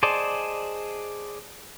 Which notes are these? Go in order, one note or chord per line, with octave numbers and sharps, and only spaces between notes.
G#4 C5 D5 D#5 A5